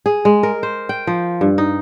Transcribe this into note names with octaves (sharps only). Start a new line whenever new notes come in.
G#4
G#3
A#4
C5
G5
F3
G2
D#4